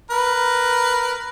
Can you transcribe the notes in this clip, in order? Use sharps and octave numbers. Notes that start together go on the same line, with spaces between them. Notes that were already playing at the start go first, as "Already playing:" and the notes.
A#4 B4